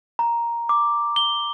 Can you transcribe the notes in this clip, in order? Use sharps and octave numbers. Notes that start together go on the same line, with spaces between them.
A#5
D6
G7